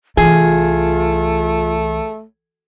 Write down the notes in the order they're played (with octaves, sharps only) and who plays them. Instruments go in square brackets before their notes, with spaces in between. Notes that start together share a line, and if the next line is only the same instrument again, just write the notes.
[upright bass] C2 E3 [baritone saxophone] A3 [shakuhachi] F4 [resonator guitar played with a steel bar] G#4